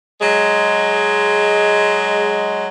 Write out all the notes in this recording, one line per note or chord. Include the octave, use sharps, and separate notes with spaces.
F#3 G#3